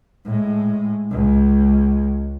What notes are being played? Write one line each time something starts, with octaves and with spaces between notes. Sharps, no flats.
A2 G#3
C#2 G#3